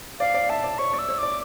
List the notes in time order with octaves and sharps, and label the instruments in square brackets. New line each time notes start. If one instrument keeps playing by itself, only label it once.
[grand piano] D5 [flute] F5
[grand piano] D5
[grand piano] E5 [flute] A5
[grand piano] D5
[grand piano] C#5 [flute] C#6
[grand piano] D5
[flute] E6
[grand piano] C#5
[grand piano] D5 [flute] D6